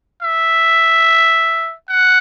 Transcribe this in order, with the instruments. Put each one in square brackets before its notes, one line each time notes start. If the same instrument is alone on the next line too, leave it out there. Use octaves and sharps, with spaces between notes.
[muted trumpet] E5
F#5